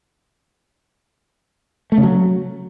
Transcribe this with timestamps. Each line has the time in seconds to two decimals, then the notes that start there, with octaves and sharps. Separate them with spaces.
1.92 A3
1.97 C#3
2.03 F#3